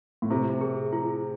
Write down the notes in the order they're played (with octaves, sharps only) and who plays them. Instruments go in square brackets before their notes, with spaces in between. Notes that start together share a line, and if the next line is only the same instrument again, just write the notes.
[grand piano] A2
[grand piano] C3 [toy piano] E4
[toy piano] G#4
E4